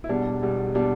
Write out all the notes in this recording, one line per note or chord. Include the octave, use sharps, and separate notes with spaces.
E4
E1 E2 B2 G3 D4
E1 E2 B2 G3
B2 G3 D4